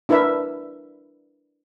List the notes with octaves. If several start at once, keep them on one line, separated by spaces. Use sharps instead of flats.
D4 E4 A#4 B4 E5